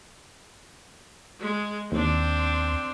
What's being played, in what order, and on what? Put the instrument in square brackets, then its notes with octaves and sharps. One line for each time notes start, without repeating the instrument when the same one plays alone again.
[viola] G#3
[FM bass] D#2 [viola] C4 D4